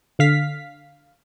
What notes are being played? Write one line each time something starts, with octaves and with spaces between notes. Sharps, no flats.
D3 F5 B6